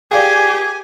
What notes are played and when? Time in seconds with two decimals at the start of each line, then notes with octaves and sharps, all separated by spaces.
0.11 G4 G#4 D5 F5 G5 G#5